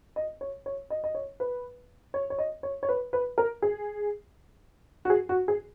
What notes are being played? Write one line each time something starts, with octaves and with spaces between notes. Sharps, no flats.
D#5
C#5
C#5
D#5
D#5
C#5
B4
C#5
C#5
D#5
C#5
C#5
B4
B4
A#4
G#4
F#4
G#4
F#4
G#4